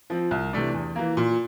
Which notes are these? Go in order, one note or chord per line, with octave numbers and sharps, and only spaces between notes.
F3 C4
C2
C3 E3 A3 D4
E2
E3 A#3
A#2